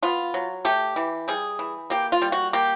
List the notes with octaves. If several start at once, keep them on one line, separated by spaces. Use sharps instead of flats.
B3 F4
F#3
A3 G4
E3
G3 G#4
E3
A#3 G4
F4
G3
F#4
A#3 G4